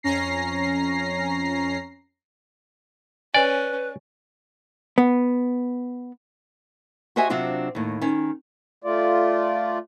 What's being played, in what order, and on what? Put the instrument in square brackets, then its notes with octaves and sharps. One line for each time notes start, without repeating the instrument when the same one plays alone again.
[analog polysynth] F2 C#4 A#5 A#6 C7
[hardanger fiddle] C#4 [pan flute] B4 [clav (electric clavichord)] D5 [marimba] G#5
[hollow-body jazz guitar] B3
[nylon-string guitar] F#4 G4 C5 D#5 E5 G#5
C3 F#3 C4 D4 F4 F#4
D#2 A2
D#3 C#4
[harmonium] A3 F4 D5